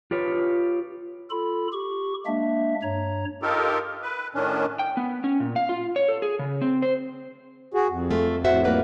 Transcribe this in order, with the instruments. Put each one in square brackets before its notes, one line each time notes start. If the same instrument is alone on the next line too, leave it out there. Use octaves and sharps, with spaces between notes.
[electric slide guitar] F4 G4 B4 C#5
[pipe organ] F4 A4 B5
G4 C#6
G#3 A#3 D4 E5
G2 C#5 A#5
[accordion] D#4 F4 G4 A4 A#4
B4
A2 D#3 C#4 D4
[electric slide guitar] G5
B3
C#4
A#2
F5
F4
C#5
A4
G#4
C#3
C4
C5
[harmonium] F#4 G#4
F2
[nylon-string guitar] A3 F4
[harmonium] F2 A2 [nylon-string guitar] F#4 C5 E5
[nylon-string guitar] G3 A#3 B4